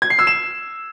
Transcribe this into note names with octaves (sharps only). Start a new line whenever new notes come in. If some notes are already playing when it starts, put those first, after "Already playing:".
G#6
C7
E6
E7